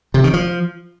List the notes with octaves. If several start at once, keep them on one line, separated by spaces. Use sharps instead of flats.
C3
D#3
F3